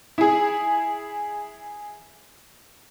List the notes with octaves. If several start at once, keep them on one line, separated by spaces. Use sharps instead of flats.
E4 G#4